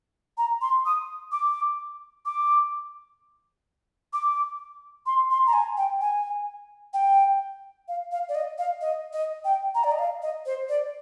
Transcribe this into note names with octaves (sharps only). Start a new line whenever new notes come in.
A#5
C6
D#6
D6
D6
D6
C6
C6
A#5
G#5
G5
G#5
G5
F5
F5
D5
D#5
F5
D#5
D#5
G5
A#5
D5
D#5
F5
D#5
C5
D5